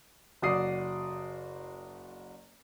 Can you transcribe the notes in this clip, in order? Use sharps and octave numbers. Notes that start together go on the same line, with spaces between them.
F#1 F#4 D5 D#6 C7